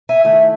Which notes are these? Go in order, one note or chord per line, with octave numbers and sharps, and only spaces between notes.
E5 G#5
D#3 A3 E4